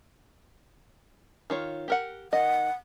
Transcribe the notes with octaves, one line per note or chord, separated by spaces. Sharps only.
D#3 F4 C#5
G4 A#4 F#5
D#3 D#5 F#5